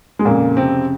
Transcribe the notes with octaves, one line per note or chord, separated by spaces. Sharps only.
G#3
F2 A#2 C#3 A#3
C3 C4